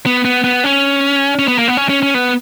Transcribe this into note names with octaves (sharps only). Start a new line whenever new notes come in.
B3
B3
B3
C#4
C#4
B3
A#3
B3
C#4
C#4
C#4
B3